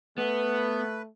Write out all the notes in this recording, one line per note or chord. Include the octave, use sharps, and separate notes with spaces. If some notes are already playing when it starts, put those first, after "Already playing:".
A3 B3 B4